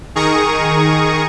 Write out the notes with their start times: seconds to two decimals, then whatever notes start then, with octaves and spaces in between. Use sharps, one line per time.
0.15 D#3 G#4 A#4 A#5 C#6 D#6